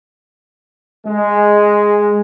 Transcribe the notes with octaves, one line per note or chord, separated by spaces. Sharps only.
G#3